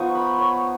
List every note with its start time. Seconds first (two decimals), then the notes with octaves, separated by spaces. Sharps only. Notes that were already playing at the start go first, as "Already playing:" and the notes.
Already playing: F3 B3 D#4 C#6 D#6
0.15 B5
0.38 C#5